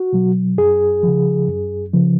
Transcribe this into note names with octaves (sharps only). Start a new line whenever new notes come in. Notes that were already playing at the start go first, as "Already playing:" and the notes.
Already playing: F#4
B2 F#3
F#2 G#4
C#3 F3
F#2
C#3 F3